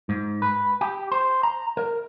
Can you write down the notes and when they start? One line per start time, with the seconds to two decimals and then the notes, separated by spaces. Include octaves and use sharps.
0.09 G#2
0.42 B4
0.81 G4
1.12 C5
1.43 A#5
1.77 A#4